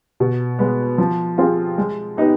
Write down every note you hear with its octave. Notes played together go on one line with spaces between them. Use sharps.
B2
G#3 B3
F3
C4 F4 G#4
G#3
B3 D#4 G4